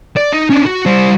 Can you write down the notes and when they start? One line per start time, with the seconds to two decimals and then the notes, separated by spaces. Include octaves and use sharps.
0.17 D5
0.33 D#4
0.50 C#4 D4
0.66 F#4
0.86 G3 C5